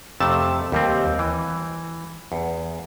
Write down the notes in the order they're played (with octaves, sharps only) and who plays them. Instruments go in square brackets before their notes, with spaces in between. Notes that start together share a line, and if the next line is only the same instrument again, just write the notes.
[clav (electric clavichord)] F2 C3 A3 A5
D#2 G3 C4
E3
E2